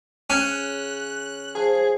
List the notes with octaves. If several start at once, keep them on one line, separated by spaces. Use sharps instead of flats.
C#3 C#4 F#6
F3 G#4